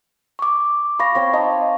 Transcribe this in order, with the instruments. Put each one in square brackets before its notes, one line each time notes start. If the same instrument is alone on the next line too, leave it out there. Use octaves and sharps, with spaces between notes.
[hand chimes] C#6 D6
[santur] F5 [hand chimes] B5 C#6 A#6
[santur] C4 C#5 G5 [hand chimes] C#6
[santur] D#4 [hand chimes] D#5 A5